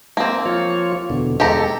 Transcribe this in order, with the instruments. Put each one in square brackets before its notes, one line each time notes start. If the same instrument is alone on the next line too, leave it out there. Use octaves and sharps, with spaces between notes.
[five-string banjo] A#3 C4
[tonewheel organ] F3 F4 C#5
E2 B2 D3
[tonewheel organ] G#3 A4 [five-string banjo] G4 A#5